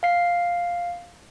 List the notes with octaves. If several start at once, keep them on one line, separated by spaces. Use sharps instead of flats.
F5 C7